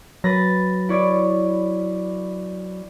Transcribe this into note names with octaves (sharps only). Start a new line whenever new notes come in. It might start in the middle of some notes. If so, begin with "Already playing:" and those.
F#3 B4 A6 A#6
E4 C#5 D5